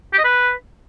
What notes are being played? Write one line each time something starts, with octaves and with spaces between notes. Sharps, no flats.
G4
D#5
B4